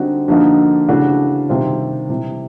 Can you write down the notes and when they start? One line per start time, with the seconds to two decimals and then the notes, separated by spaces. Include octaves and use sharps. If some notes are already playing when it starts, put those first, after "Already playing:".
Already playing: D3 G3 C4 D#4 F#4
0.28 D3 F3 A#3 D#4 F#4
0.88 C#3 E3 A3 D4 F#4
1.49 C3 D#3 G3 C4 F4
2.09 C3 E3 G3